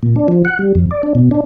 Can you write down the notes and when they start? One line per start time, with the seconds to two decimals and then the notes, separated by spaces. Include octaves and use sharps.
0.03 A#2
0.16 D4
0.28 F3
0.45 F#5
0.59 G3
0.75 F2
0.91 D5
1.03 D4
1.15 B2
1.31 D4